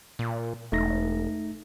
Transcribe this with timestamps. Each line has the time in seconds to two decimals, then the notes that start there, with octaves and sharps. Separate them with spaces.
0.19 A#2
0.72 E1 A3 D#4 A#6